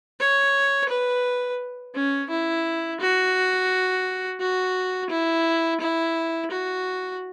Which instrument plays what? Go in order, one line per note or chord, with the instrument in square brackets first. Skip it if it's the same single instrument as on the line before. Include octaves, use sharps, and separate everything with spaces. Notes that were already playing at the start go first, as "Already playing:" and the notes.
[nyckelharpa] C#5
B4
C#4
E4
F#4
F#4
E4
E4
F#4